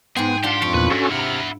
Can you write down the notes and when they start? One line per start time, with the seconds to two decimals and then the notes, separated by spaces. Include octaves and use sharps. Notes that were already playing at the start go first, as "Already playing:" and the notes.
0.16 G#2 B3 G#4 F#5 G5 C6
0.43 D4 F4 G4 F5 F#5 A5
0.62 F2 F3 F4 C#6
0.74 E2 A#2 B4 F#6
0.91 G#2 C#4 F#4 A4
1.11 C3 E4 F#5 A#5 B5 F6